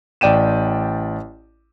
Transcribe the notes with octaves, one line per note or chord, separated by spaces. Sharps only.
A1 D5 G5 D#7 E7